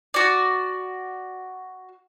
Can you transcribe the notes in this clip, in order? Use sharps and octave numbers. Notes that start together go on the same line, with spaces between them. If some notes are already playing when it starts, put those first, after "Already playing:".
F#4 D5